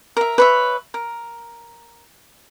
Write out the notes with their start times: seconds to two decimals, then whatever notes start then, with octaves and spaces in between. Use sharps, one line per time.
0.17 A#4 E5
0.38 B4 C#5 E5
0.94 A#4